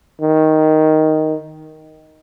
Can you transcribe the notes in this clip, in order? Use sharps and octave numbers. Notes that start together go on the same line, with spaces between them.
D#3